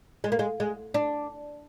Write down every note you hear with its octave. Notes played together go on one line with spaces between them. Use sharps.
G#3
A#3
G#3
G#3
D4